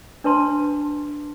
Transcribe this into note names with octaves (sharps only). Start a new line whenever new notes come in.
D4 B4 A5 C6